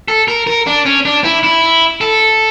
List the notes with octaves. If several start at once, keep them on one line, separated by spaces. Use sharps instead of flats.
A4
A#4
A#4
D4
C#4
D4
E4
E4
A4